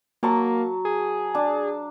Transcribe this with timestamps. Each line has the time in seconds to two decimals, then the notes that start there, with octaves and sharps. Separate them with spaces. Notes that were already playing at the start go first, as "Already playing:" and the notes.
0.23 F#3 A#3 A5 C#6
0.85 G#4
1.35 D4 A5